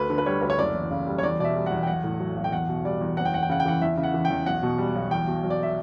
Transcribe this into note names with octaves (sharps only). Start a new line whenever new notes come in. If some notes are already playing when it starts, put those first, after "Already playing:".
Already playing: D2 B4
D3
B4
G3 C#5
D2 B4
C#5
F#1 D5
E2
C#3
G3
C#5
E2 D5
B2 D5 E5
G3
F#5
E2
G5
B1 F#5
A2
F#3
B1
G5
E2 F#5
B2
G3 D5
E2
F#1 F#5
G5
E2 F#5
G5
C#3 F#5
G5
E3 F#5
E2 E5
C#3
F#5
E3
G5
E2
B1 F#5
B2
G3
B1
E2 G5
B2
F#3
D5
E5